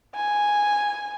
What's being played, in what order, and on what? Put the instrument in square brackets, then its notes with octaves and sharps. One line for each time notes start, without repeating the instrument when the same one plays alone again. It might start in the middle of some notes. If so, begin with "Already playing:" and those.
[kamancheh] G#5